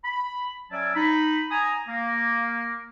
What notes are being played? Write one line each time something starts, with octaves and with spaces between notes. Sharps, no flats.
B5
F#3 C#4 D5 E5 G#5 A5
D#4 B5
G#5 A#5 D#6
A#3